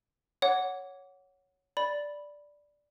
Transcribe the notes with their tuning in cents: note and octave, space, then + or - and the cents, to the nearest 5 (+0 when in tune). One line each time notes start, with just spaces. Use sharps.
C#5 +5 F#5 +0 D6 -25
D5 +0 B5 -5